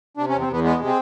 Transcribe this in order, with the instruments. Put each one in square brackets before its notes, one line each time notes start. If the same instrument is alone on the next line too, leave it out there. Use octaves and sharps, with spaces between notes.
[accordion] C3 D4
C#4
E2
C4
E2 B3
G#3 B3
C3
C4